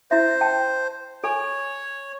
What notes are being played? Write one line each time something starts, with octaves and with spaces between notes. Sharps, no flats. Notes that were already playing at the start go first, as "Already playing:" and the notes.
E4 C5 E5
G5 A5
A4 C#5 G#5